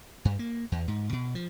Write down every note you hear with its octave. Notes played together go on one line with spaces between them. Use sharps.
G2
A#3
E2
G#2
B2
F3